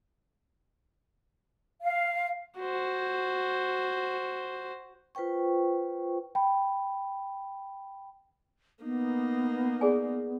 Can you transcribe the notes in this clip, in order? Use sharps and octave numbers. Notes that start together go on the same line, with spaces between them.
F5
F#4 C5
F4 B4 C5 G5 C#6
G5 B5
A#3 B3 D#4
G#4 D5 G#5